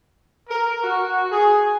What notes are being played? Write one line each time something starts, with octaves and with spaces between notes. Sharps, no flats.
A#4
F#4
G#4